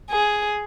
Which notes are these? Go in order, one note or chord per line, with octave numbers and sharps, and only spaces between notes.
G#4